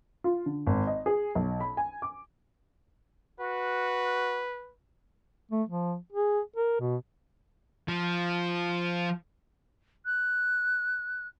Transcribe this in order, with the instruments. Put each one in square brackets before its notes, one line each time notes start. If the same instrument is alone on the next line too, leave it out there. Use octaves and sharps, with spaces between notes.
[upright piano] F4
D3
G#1
D#5
G#4
B1
B5
G#5
D6
[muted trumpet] F#4 [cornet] B4
[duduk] A3
F3
G#4
A#4
B2
[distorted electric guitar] F3
[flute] F#6